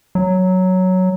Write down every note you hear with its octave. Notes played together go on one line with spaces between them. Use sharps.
F#3